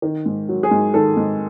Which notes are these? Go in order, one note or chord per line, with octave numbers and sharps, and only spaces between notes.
D#3
G#2
F#3
G#4
G#2
D#3 A4
G#2